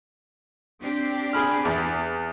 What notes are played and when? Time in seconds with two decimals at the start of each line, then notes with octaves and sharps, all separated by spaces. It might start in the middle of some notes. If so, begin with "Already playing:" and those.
0.81 C4 D4 G4
1.33 G#4 B5 F6
1.65 E2